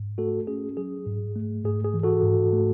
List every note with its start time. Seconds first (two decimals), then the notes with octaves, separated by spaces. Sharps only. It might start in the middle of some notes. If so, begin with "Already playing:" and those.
Already playing: G#2
0.18 A3 F#4 A4
0.47 C#4 G#4
0.77 F#3 G#4
1.06 G#2
1.36 A3
1.64 G#2 G#4
1.85 G#4
1.94 E3
2.03 F#4 A4
2.23 G#2
2.53 A3